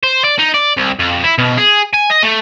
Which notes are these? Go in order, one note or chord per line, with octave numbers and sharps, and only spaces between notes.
C5
D5
D#4
D5
C2
F2
E4
B2
G#4
G#5
D#5
A3